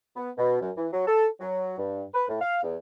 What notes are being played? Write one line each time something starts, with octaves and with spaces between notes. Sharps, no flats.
B3
B2
F#2
E3
F#3
A4
F#3
G2
B4
A2
F5
E2